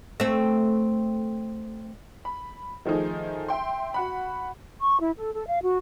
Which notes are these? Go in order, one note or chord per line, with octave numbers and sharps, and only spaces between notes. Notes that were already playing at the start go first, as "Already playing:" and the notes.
A3 C4
B5
D#3 F3 A3 D#4 G#4
E5 G5 C6
F#4 F#5 B5
C#6
E4
A4
A4
F5
F#4